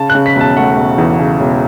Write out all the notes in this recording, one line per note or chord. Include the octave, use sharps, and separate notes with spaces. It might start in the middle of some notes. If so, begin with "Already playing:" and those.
Already playing: C#3 A5
F#6
C#3
B6
E1
A5
A3 F#5
E1
E2
C#3
E1